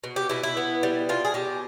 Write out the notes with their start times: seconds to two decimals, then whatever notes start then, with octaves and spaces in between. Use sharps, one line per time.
0.04 B2
0.16 G4
0.29 B2 E4
0.43 E4
0.57 B3
0.83 G3
1.09 B2 F4
1.25 G#4
1.34 B2 G4